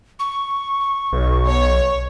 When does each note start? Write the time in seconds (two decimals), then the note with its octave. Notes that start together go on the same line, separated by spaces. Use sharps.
0.20 C#6
1.13 B1
1.48 C#5